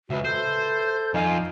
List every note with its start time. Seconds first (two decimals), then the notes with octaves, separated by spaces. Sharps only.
0.10 C#2 F#4 B4 E5
0.25 A4 C5 G6
1.14 F2 D#4 F4 F5 G#5 C7 D#7